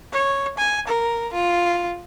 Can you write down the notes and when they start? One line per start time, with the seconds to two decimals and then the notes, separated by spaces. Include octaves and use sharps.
0.13 C#5
0.58 G#5
0.87 A#4
1.33 F4